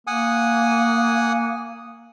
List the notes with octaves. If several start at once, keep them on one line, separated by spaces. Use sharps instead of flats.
A#3 F#5 G#5 D#6